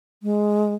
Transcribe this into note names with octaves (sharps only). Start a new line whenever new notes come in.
G#3